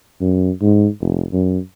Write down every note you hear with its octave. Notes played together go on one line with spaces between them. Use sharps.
F#2
G#2
F1
F#2